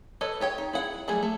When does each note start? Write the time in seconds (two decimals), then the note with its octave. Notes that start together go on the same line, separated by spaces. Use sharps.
0.21 A4 B4 C#5 D#5
0.40 F4 G4 C#5 G5
0.58 D#4
0.73 E4 G#4 F#5
1.08 F#3 G3 A3 G#4
1.23 A3